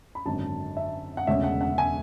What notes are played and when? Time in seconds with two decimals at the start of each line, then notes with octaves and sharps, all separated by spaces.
0.15 B5
0.26 G#1 F#2 D3 A5
0.77 E5
1.17 F#5
1.27 E1 D2 C#3 G#3 C#4 E5
1.44 F#5
1.61 F#5
1.78 G#5